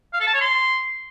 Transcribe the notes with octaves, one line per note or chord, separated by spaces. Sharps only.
F5
A4
A5
C#5
C6